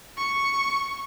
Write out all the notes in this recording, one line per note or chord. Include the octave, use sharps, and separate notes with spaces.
C#6